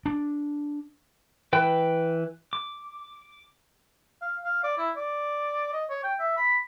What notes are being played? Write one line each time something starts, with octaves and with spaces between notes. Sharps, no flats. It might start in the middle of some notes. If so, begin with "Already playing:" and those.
D4
E3 B4 G5
D6
F5
F5
D5
E4
D5
D#5
C#5
G5
E5
B5